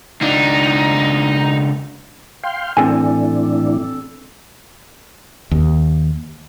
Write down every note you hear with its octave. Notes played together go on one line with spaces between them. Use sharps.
C#2 D4 D#4
F5 G5 C6
A2 E3 C4 D4 A4 G#5
D#2